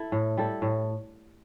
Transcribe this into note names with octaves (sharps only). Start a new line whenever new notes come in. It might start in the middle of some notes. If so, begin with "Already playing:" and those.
Already playing: E4 A4
A2
G3 E4 A4
A2